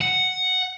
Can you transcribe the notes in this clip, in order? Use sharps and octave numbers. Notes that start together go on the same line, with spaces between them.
F#5